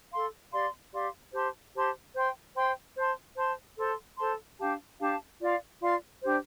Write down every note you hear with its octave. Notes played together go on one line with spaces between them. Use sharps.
A4 F5 C6
G4 D5 F5 C6
G4 D5 F5 C6
G4 C5 A5 C6
G4 C5 A5 C6
C5 G5 C6
C5 G5 C6
C5 A5 C6
C5 A5 C6
A4 C5 A5 C6
A4 C5 A5 C6
D4 G4 F5 A5
D4 G4 F5 A5
F4 D5 F5 C6
F4 D5 F5 C6
D4 G4 C5